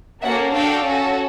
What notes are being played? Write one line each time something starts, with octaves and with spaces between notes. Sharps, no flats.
A#3 C#4 F#4 A4 E5 F#5
D4 F#4 A4 F5 G5
C#4 F#4 A4